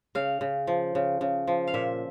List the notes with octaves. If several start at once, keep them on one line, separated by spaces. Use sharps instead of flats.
C#3 F5
C#3
F3
C#3
C#3
F3
F5
A#2 E5